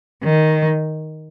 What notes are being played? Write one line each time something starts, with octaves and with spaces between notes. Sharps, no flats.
D#3